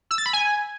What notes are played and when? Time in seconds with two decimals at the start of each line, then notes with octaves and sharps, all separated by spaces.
0.11 E6
0.18 A6
0.26 B5
0.33 G#5